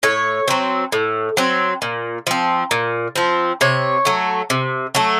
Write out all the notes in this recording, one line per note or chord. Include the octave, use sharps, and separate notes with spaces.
A2 C#5
F#3 C4
A2
F#3 C4
A#2
F3 C4
A#2
F3 C4
C3 C#5
F#3 A3
C3
F#3 A3